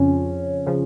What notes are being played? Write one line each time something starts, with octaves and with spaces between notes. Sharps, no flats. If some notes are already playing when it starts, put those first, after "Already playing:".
Already playing: F2 C#3 F3 C#4
C#3 F3